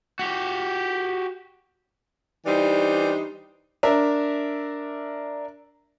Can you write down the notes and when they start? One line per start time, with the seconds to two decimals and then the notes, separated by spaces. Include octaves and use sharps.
0.19 F#4 G4
2.46 E3 G3 D4 D#4 C5
3.83 D4 A#4 E5